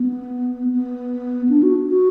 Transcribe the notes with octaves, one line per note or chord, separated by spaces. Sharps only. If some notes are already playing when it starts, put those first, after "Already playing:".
Already playing: B3
B3
D4
F#4
F#4